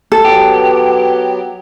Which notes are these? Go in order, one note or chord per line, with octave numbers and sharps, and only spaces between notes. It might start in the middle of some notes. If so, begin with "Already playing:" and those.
A4
F#3 B3 G4